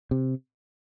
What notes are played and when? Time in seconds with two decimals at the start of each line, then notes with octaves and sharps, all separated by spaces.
0.11 C3